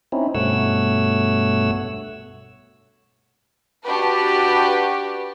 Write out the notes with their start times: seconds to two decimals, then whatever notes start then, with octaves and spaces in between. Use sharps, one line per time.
0.12 C4 C#4 D#4 E4
0.35 G2 B2 A3 C#5 F#5 E6
3.85 D4 F#4 G4 B4